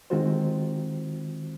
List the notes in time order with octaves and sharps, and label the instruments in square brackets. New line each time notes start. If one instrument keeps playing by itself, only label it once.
[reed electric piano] D#3 G#3 C4 F4 F#4 C5